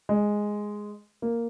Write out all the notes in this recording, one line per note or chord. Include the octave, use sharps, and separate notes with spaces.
G#3
A#3